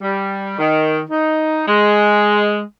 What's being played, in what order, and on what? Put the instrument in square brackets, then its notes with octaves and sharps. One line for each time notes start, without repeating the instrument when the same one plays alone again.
[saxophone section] G3
D#3
D#4
G#3